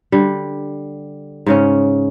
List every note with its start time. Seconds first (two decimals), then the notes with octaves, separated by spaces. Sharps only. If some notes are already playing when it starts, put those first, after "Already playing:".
0.12 D3 G3
1.46 G#2 C#3 C#4